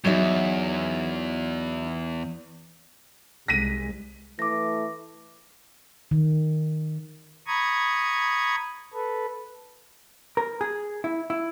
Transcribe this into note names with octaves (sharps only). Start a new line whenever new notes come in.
E2 F#3 D#4 E5
C2 G#3 A#6 B6 D#7
E3 A3 D6 A#6
D#3
A#5 B5 C#6 D#6 G#6
A4 B4
A#4
G#4
E4
E4